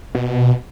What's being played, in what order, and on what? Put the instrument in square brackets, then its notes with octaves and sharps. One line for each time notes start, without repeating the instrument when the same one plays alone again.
[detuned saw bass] B2